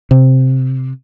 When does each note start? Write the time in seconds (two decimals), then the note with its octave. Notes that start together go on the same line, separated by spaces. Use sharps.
0.11 C3